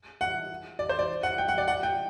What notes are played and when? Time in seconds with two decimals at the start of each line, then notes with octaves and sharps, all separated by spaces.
0.21 F#5
0.79 D5
0.89 C5
0.99 D5
1.23 F#5
1.38 G5
1.48 F#5
1.58 D5
1.68 F#5
1.83 G5